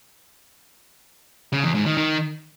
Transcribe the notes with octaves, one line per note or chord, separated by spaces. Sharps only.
C#3
E2
G#2
D#3
D#3